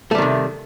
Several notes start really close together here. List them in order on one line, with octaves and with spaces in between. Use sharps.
A3 G3 D#3 C3